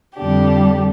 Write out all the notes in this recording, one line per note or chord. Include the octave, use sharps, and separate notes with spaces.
F2 D3 G3 D4 G4